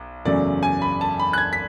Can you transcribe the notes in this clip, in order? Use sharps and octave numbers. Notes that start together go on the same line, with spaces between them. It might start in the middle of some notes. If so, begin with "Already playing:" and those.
Already playing: B1
F#1 E2 C#3 F#3 A3 D5
G#5
B5
A5
B5
F#6
G#6
B6